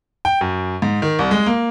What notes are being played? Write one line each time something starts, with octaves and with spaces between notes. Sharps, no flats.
G5
F#2
G#2
D#3
C2
G#3
A#3